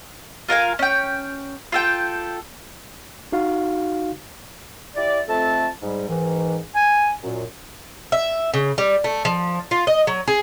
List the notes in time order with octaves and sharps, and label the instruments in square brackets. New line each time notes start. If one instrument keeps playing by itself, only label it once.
[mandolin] F4 A#4 F5 G#5
C#4 G5
F4 A4 G5
[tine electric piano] D#4 F#4 F5
[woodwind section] E4 G4 D5
F2 A3 C4 A4 A5
G#2 G3
G#2 D#3 E3
G#5
F#2 A#2
[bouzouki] E5
C#3
G3
A3
F3
F4
D#5
F#3
G#4